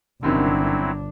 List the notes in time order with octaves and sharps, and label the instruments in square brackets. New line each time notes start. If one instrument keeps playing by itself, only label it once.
[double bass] G1 D4 [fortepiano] F#2 C3 D#3 [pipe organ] F#3 C4 E4